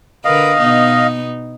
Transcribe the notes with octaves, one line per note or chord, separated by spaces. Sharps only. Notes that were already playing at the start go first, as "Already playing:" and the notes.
D3 A#4 B4 D#5 F5
B2 B3 D#4